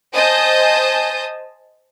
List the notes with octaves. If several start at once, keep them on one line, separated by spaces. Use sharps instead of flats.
C5 D#5 G#5 A5 D#6 G6